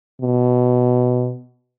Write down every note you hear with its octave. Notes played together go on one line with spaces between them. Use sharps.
B2